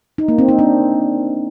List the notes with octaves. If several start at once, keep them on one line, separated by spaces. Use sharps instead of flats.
D#4
A#3
C4
D#4
D4